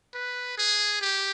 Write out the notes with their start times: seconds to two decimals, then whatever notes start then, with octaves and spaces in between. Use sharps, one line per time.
0.14 B4
0.58 G#4
1.01 G4